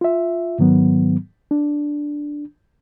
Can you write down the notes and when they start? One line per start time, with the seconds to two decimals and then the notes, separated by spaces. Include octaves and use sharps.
0.01 F4 E5
0.59 G#2 D#3 F#3 B3
1.51 D4